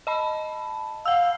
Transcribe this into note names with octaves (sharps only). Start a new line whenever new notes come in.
D#5 A5 B5
F5 F#5 E6